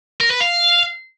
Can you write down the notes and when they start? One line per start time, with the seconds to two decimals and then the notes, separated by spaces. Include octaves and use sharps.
0.21 A#4
0.31 B4
0.41 F5